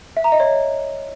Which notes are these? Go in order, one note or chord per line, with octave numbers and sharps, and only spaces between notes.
E5
A#5
D#5
C#5